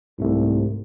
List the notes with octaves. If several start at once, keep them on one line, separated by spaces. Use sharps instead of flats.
C2 G#2 A3